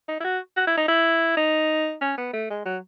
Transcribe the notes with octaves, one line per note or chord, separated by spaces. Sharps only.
D#4
E4
F#4
F#4
E4
D#4
E4
D#4
C#4
B3
A3
G#3
F#3